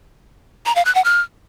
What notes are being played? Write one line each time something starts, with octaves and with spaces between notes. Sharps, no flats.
A#5
F5
F#6
F#5
F6